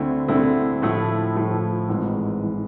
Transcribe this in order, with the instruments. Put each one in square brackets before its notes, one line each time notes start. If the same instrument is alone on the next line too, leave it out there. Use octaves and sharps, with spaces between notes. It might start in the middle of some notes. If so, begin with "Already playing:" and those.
Already playing: [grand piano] D2 D3 A3 C4 E4
D2 D3 A3 C4 E4
A2 F3 A3 E4
A2 F3 A3 E4
G#1 G#2 E3
E3